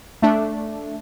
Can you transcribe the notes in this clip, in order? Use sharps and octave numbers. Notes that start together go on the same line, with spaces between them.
A3 D4